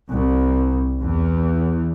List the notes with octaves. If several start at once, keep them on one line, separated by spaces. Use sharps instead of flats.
C2
E2